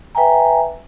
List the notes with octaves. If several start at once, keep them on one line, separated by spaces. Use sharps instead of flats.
B4 E5 G5 G#5 A#5